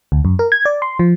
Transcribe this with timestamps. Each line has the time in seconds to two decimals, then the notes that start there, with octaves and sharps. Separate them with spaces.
0.12 D2
0.25 F#2
0.39 A#4
0.52 G#6
0.65 D5
0.82 C6
0.99 F3